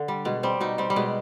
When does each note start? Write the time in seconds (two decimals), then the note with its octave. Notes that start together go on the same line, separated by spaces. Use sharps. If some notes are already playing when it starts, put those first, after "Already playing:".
Already playing: D3
0.08 G3
0.25 B2 G#3
0.43 G3 C4
0.61 B2 D#4
0.78 G3 C4
0.90 G3
0.96 B2 G#3